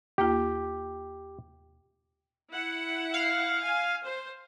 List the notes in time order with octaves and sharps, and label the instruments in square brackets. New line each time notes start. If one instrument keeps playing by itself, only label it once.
[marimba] D#2 A#3 F4 [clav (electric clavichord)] G4
[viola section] E4 F#5
[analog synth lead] F5
[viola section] G#5
C5